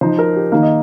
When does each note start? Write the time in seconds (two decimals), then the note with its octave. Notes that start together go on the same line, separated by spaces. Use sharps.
0.01 F3 D#4 C5
0.19 A#4
0.36 G4
0.52 D#3 A#3 D#4 F5
0.63 D#5